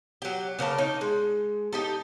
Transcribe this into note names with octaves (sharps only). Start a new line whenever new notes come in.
F#3 G4
C#3 A#3 C#5 A5
D#4
G#3
D#4 G4 A4